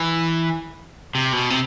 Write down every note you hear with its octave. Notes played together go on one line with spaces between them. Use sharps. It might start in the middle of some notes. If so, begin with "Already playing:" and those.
Already playing: E3
C3
B2
C3